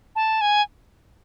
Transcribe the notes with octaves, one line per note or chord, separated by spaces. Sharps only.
A5
G#5